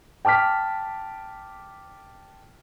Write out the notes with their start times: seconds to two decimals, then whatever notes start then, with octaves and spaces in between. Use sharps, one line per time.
0.25 G5 A5 D6 F6 B6